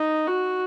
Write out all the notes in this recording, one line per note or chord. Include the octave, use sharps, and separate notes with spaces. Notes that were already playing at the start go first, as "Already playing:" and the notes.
Already playing: D#4
F#4